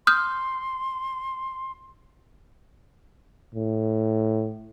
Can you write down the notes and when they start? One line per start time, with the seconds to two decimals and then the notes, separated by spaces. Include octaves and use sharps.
0.07 C6 D#6 F6 G6
3.55 A2